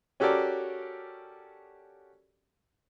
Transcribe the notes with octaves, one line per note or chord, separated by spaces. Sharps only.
C#4 F#4 G4 A4 A#4 D5